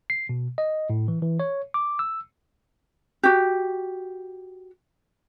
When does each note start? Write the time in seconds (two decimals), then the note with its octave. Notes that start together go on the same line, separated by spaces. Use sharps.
0.10 C7
0.29 B2
0.58 D#5
0.90 A2
1.08 E3
1.22 E3
1.40 C#5
1.74 D6
1.99 E6
3.23 F#4 G4